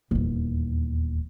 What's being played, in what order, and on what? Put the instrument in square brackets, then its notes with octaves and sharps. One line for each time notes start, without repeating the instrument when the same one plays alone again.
[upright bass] D#1 E2